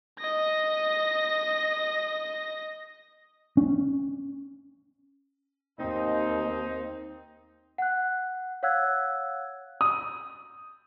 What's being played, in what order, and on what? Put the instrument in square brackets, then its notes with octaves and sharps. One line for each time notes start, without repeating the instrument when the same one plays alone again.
[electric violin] D#5 A#6
[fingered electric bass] C#4
[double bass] D#2 [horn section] C4 D#4
[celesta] F#5 F#6
C#5 F5 F#5 E6 F#6 G#6
[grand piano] D#6